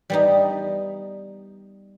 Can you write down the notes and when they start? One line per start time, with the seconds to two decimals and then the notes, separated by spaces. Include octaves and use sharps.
0.10 G3 B3 D#4